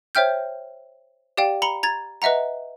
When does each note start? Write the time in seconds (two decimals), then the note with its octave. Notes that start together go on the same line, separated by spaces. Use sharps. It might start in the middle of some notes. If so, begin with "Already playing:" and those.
0.15 C5 C#5 E5 G5 F6 G6
1.37 G4 D5 F5 G5
1.62 A#5 B5 C#7 G7
1.83 A#5 G#6 A6
2.22 B4 D#5 E5 F#5 A#5